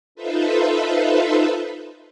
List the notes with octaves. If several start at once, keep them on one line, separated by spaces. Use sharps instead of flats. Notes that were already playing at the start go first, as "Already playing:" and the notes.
D#4 F4 A4 B4 C5 E5